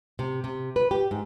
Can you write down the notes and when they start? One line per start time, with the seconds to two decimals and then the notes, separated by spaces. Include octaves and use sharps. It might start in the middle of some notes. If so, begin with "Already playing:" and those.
0.19 C3
0.44 C3
0.76 B4
0.91 G4
1.11 G#2